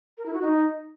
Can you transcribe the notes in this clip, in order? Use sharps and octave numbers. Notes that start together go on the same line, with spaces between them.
A#4
E4
F#4
D#4